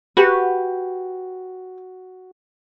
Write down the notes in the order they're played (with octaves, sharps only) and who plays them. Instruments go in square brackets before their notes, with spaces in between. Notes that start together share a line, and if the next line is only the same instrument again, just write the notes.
[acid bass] F#4 [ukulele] G4 B4